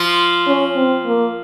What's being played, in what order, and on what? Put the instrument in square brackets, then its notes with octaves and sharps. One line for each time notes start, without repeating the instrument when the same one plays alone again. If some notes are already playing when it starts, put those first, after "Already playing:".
Already playing: [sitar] F3 F4
[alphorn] C#4
C4
A#3